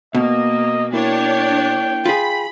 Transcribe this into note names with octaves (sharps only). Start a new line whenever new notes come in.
B2 A#3 D#5
A#3 D4 E4 A#4 C#5 G5
F4 G#4 B5